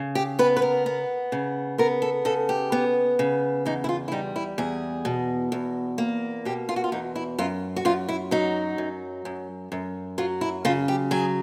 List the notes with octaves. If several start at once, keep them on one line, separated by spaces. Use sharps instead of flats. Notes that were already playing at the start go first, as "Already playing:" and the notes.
Already playing: C#3
G4
B3 B4
B4
A#4
B3
C#3
B3 A#4
A4
C#3 A4
G4
B3
C#3
E2 D#4
E4
F4
E4
G3 D#4
E4
E2 G#4
B2
E2
A#3
B2 G4
F4
F#4
F4
E2 D#4
E4
F#2 F4
F#4
F#2 F4
E4
F#3 D#4
F#2
F#2
F#2
F#3 F4
E4
C#3 F4
G4
F#3 G#4